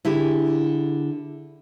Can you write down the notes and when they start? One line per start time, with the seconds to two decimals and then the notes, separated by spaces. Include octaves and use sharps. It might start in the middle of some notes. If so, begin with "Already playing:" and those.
0.05 D3 E4 G4 G#4